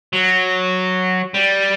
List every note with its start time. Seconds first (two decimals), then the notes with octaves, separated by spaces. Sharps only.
0.13 F#3
1.34 G3